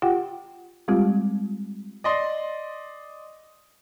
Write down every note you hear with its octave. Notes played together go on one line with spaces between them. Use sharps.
F4 G4 F#5 G5
G3 G#3 C4 F4 G4
D5 D#5 C6